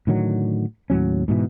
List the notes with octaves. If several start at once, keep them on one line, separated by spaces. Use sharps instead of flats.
A2 D3 D#3 F#3
D#2 A2 F#3 C#4
G#2 B2 E3